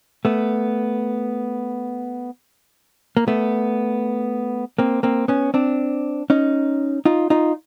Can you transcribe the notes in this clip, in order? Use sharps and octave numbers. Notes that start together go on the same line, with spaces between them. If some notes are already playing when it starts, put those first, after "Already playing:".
A3 B3
A#3
A3 B3
A#3 C4
A#3 C4
B3 C#4
C4 D4
C#4 D#4
D#4 F4
D#4 F4